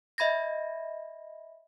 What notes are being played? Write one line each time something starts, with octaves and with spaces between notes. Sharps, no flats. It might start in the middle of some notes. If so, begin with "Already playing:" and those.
D#5 E5 B5 G#6 A#6